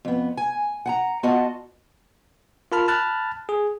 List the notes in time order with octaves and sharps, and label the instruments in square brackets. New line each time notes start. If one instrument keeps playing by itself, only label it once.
[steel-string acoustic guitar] F2 B3
G#5
F#5 G#5 A#5
B3 F4 F#4 D#5 F#5 A5
[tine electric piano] F4 A#4 A5 B5 F6
A5 B5 F6 F#6 A6
G#4